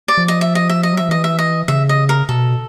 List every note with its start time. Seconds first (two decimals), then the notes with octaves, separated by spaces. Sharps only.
0.08 D5
0.17 F3
0.28 D#5
0.41 E5
0.55 D#5
0.69 E5
0.83 D#5
0.93 F#3
0.97 F3 E5
1.09 E3 D#5
1.24 E5
1.39 D#5
1.68 C#3 E5
1.89 D#5
2.09 A#4
2.29 B2 A4